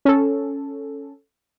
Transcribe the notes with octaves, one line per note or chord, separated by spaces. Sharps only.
C#4 A4